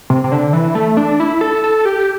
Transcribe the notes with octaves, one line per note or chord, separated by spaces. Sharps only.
C3
C3
D3
E3
A3
D4
E4
A4
A4
G4